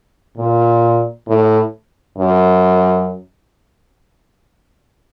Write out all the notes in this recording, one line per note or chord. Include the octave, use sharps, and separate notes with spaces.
A#2
A2
F#2